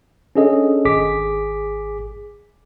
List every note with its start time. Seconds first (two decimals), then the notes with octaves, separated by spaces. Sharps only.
0.35 C#4 D4 G#4 A4 D#5
0.85 G#1 G#4 D6 B6